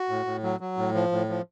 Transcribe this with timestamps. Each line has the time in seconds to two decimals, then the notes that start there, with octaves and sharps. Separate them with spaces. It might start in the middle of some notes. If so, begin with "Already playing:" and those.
Already playing: F#4
0.09 A2
0.26 A2
0.43 F#3
0.60 F#3
0.77 A2
0.94 F3
1.12 A2
1.29 F3